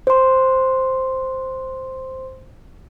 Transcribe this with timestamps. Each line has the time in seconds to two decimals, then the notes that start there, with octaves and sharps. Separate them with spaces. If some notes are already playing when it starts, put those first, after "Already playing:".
0.07 C5 C6